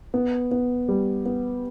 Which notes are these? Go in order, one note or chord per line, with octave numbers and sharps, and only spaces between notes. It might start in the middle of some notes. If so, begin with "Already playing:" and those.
B3
B3
G3
B3